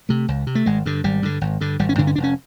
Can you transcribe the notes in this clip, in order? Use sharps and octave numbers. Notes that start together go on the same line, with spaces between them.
C3 A3
C#2
C3
A3
G#1 G#3
G2 D3
G#1 G3
G2 D3
G#1
G2 D3
G#1 G3
C#4
G2 D3 D4
C#4
F1 D4
C#4